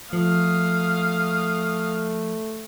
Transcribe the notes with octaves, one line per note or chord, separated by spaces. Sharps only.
F3 A3 F5 D#6